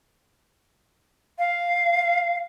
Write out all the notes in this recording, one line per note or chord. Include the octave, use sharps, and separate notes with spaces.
F5